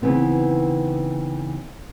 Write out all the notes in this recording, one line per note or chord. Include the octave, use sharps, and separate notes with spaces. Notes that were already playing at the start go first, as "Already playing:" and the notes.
C#3 E3 B3 C4 D#4